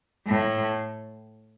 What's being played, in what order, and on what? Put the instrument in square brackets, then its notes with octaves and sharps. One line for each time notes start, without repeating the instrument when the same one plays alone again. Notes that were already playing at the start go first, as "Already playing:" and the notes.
[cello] A2